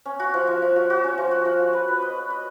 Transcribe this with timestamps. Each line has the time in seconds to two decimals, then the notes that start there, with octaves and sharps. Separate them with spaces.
0.05 C#4
0.19 F#4
0.34 F3
0.47 F3
0.62 F3
0.76 F#4
0.90 F#4
1.04 C#4
1.18 F3
1.31 F#4
1.45 F3
1.60 F#4
1.73 B4
1.88 B4
2.02 D#5
2.16 B4
2.30 D#5